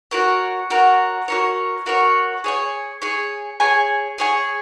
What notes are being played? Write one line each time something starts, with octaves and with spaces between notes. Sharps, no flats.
F#4 A#4 C#5
F#4 A#4 C#5
F#4 A#4 C#5
F#4 A#4 C#5
G#4 C#5 G#5
G#4 C#5 G#5
G#4 C#5 G#5
G#4 C#5 G#5